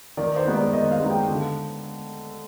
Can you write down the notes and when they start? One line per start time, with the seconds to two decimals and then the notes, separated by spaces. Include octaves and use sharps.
0.17 D#3 D5
0.36 C5
0.45 G#3 B3 D#4
0.54 D5
0.73 D#3 D#5
0.91 F5
1.00 G#3 B3 D#4
1.10 G5
1.29 D3